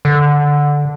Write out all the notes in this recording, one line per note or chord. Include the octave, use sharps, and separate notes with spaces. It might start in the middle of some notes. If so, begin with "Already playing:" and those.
D3